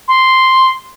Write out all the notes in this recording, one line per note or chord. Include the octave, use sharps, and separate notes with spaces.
C6